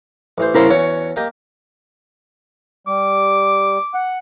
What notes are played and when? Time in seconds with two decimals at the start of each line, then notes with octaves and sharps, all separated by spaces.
0.38 A1 E3 C5
0.55 A#3 C#4 E4 G#4 A#4 C5
0.70 E2 C#4 F#4 C#5
1.16 A#3 G4 D#5
2.87 G3 D6
3.94 F#5